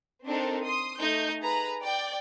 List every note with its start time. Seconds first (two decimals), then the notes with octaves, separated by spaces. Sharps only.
0.25 C4 D4 D#4 A4 A#4
0.63 C6 D#6
0.99 A3 D#4 G6
1.41 G#4 B4 A#5 B5
1.82 D5 G5